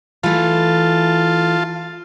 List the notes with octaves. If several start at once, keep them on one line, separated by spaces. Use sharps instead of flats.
E3 A3 F4 A5